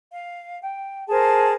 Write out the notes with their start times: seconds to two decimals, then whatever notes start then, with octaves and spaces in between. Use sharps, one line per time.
0.13 F5
0.62 G5
1.09 G#4 A#4 C5 A5